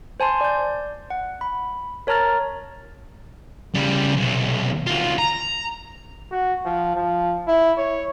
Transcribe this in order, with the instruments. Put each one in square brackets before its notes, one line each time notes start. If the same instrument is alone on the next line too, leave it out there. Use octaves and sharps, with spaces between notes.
[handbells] C5 G#5 A5 C6
D5 G6
F#5
B5
A#4 C#5 A5 A#5 F6 A6
[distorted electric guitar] C#3 G3
B1 C3
D2 F4
A#5
[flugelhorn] F#4
F3
F3
E4
C#5